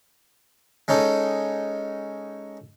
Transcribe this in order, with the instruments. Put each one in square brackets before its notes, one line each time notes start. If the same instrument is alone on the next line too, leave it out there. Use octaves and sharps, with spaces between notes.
[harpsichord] G#3 C#4 D#4 A4